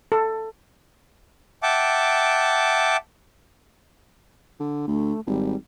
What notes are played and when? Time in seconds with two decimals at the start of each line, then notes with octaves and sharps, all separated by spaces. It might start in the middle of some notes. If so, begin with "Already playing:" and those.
0.12 A4
1.63 E5 F#5 G5 A5 D6
4.60 D3
4.87 D2 A3
5.27 G#1 G3